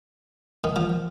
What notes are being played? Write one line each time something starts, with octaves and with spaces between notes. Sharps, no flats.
D#3
F3